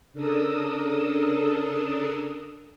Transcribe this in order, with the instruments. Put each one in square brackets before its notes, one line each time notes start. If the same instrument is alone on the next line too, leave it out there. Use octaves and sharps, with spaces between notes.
[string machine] C#3 D4 A4 A#4 D#6 E6